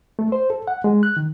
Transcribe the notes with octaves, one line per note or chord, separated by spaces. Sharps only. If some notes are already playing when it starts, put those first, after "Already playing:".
A3
C5
A4
F#5
G#3
F#6
D#3